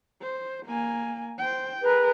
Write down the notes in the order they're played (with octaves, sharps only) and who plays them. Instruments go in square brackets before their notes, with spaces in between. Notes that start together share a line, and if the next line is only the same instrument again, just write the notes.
[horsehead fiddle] C5
A#3 G#5
C5 G5
[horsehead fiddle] G#4 A#4 [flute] B4